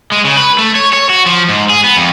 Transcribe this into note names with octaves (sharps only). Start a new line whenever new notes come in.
G#3
C#3
B4
A3
C#5
C#5
F#4
F3
G#2
G#4
B3
F2